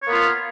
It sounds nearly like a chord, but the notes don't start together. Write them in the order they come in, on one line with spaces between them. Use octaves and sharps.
C#5 A#3 B3 F4